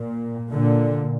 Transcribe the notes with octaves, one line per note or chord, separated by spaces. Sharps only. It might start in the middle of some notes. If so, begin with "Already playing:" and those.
Already playing: A#2
A#2 D3